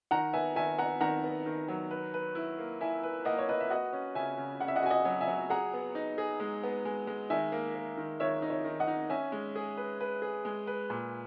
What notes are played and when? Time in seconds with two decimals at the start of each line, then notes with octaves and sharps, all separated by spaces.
0.11 D#3 F#5 A#5
0.33 B3 E5 G#5
0.56 D#3 E5 G#5
0.78 B3 F#5 A#5
1.01 D#3 F#5 A#5
1.24 B3
1.46 D#3
1.68 F#3
1.91 B4
2.14 B4
2.35 E4
2.59 A#3
2.81 E4 E5 G#5
3.03 B4
3.25 A#3 D#5 F#5
3.39 C#5
3.49 B4 D#5
3.60 E5
3.70 F#4 D#5 F#5
3.93 C#4
4.15 C#3 E5 G#5
4.38 C#3
4.60 C#3 F#5
4.68 E5
4.76 D#5 F#5
4.83 F#4 G#5
4.90 D#5 F#5
5.05 F#3
5.21 E5 G#5
5.27 F#3
5.50 G#4 F#5 A#5
5.73 B3
5.95 D#4
6.18 G#4
6.40 G#3
6.63 B3
6.85 G#3
7.07 G#3
7.30 D#3 E5 G#5
7.52 A#3
7.75 A#3
7.98 D#3
8.20 D#3 C#5 E5
8.42 D#4
8.50 C#5 E5
8.65 D#3
8.80 D#5 F#5
8.88 D#4
9.10 C#4 E5 G#5
9.32 G#3
9.56 G#4
9.77 B4
10.00 B4
10.22 G#4
10.45 G#3
10.67 B4
10.90 A#2